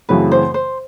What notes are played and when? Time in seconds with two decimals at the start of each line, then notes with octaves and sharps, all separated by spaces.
0.09 F#2 C#3 E3 A3 C4 B4
0.32 C5
0.54 C5